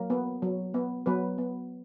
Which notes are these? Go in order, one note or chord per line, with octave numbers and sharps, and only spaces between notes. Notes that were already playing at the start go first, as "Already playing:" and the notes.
Already playing: F#3 A#3 A#4
B3
F#3
B3
F#3 B3 B4
B3